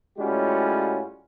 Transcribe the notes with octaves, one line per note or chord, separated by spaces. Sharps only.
A2 G3 G#3 C#4 F4 F#4